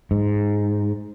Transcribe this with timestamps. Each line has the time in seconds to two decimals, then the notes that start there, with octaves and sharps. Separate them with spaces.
0.11 G#2